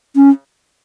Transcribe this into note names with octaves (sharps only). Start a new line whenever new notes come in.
C#4